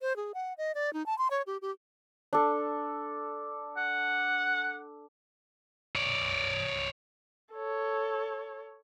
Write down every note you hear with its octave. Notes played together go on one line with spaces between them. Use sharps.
C5
G#4
F#5
D#5
D5
D#4
A5
C6
C#5
G4
G4
D4 A4
F#5
C#5 D5
A4 C#5